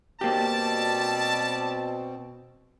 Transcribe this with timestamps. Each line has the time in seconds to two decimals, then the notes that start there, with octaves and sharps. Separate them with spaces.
0.21 B2 G3 A#3 C4 G4 D5 A5